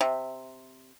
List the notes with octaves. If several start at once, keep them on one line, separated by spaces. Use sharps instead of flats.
C3